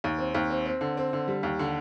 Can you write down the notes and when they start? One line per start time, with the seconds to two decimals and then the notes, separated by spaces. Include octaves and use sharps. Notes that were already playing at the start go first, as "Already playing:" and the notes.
0.04 D#2
0.19 C4
0.34 D#2
0.50 C4
0.66 C4
0.81 D3
0.97 C4
1.13 D3
1.28 G3
1.43 D#2
1.59 D3